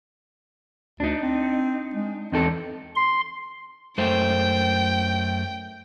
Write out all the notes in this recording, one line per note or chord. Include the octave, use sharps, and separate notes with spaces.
D2 D4 D#4
C4
G#3
E2 C4 D#4 A4
C6
F#2 A3 C5 G5